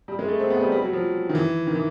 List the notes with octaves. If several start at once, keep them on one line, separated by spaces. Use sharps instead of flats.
G3
G#3
A3
C4
B3
G3
G3
F#3
F3
D#3
E3
D#3
E3